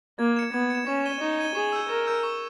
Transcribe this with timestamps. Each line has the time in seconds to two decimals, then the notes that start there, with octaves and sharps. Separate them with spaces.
0.19 A#3 G#6
0.36 C#7 E7
0.54 B3 G#6
0.70 C#7 E7
0.87 C#4 C#6
1.05 G#6 D#7 G7
1.21 D#4 C#6
1.39 G#6 D#7 G7
1.55 G#4 C#6
1.73 E6 G6
1.89 A#4 C#6
2.07 E6 G6
2.23 C#6